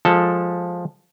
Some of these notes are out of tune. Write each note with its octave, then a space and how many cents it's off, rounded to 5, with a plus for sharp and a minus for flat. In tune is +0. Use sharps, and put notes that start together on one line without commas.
F3 +10 G#3 +0 A4 +0